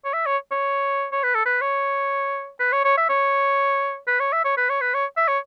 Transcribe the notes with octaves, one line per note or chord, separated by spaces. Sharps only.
C#5
E5
C#5
C#5
C#5
B4
A4
B4
C#5
B4
C#5
C#5
E5
C#5
B4
C#5
E5
C#5
B4
C#5
B4
C#5
E5
C#5